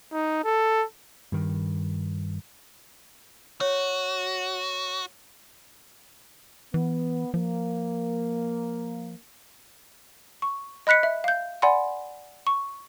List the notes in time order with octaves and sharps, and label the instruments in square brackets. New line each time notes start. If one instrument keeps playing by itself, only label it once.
[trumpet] D#4
A4
[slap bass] G2 D#3
[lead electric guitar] F#4 [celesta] C#5
[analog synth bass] E3 [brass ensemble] B3
[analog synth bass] F3 [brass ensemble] A#3
[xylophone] C#6
D#5 B5 F#6 B6 C#7
E5
F5 G6
D5 F#5 G#5 B5 C6
C#6